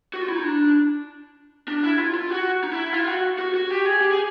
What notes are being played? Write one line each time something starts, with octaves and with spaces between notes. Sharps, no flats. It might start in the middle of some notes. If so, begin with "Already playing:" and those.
F#4
F4
E4
D#4
D4
D4
E4
F4
F4
F#4
D#4
E4
F4
F#4
F#4
F#4
G4
G#4
G4
G#4